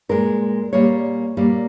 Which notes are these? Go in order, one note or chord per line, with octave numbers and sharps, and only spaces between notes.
A#2 G#3 A#4
A#2 G3 A#3 C#5
A#2 G3 A#3